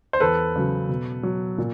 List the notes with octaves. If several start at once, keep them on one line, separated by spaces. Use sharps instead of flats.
C5
E2 A4 B4
C#3 F#3
B2
F#3
A#2